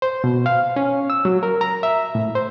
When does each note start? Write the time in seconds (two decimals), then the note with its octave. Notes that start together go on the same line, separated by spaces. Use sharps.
0.02 C5
0.24 B2
0.46 F5
0.76 C#4
1.10 E6
1.25 F#3
1.43 A#4
1.61 A#5
1.83 E5
2.15 A2
2.35 C5